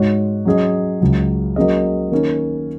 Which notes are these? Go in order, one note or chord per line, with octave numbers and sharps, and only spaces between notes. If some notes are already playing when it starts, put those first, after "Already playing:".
Already playing: G#2 G#3 F#4 C#5
F#3 C#4 G#4 D#5
C#2 C#3 F#3
F#3 A#3 C#4 G#4 D#5
D#3 A#3 C#4